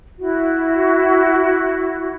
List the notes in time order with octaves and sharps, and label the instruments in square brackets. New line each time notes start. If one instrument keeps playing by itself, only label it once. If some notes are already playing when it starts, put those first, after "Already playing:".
[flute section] E4 F#4